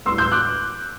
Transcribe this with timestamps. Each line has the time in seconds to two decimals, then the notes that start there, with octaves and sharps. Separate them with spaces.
0.05 A2 G3 B3 C6 E6
0.18 E6 G6
0.32 D6 F#6